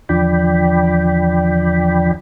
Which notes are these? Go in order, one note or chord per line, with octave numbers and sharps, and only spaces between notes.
E2 D3 F3 D5 G5 B5